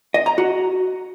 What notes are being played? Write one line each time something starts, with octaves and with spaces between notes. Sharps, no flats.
D#5
A#5
F#4